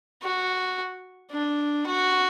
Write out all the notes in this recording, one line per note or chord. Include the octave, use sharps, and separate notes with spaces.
F#4
D4
F#4